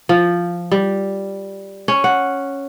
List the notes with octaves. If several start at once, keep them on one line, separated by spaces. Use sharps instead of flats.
F3
G3
C#4
F#5